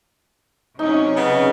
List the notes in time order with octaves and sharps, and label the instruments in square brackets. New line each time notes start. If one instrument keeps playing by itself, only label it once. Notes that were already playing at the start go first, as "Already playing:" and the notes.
[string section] C3 F#3 C#4 [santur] D#4
[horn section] C#3 B3